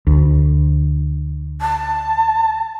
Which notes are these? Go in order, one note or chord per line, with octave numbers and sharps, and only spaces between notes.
D2
A5